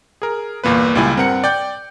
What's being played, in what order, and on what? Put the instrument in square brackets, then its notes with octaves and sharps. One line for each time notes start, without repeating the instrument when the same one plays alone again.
[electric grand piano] G#4 A#4
G1 E2 A#2 A#3 B4
C#2 A#2 G3 E4 G#5
G2 C4 A#4 F#5 C#7
D5 G5 G6